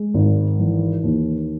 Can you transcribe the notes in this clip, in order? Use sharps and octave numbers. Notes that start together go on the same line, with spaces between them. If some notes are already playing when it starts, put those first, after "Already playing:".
Already playing: G#3
G#1
E3
D#2